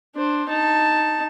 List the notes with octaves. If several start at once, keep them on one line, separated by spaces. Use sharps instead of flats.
D4 C5
D#4 A5